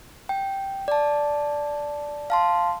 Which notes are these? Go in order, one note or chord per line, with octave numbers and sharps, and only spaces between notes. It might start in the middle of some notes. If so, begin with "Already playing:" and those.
G5
D5 A5
F5 A5 C6